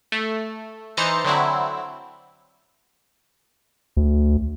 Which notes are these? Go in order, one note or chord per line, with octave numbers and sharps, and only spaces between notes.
A3
E3 D#4 C5 A#5 A6 C#7
D3 F#3 C4 E4
D2